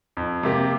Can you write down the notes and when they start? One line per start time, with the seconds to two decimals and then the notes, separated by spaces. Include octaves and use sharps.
0.17 F2
0.43 C3 A#3 G4